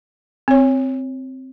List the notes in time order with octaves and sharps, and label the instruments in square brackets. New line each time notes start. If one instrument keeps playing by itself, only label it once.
[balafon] C4 C#5